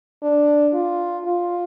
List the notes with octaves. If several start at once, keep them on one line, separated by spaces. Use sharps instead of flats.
D4
F4
F4